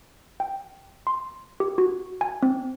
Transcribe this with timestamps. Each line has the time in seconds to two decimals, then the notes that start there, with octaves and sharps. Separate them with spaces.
0.40 G5
1.07 C6
1.60 G4
1.78 F#4
2.21 G#5
2.43 C4